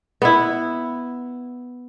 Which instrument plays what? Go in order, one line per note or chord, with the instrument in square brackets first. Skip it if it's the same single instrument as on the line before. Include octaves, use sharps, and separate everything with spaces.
[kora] B3 E4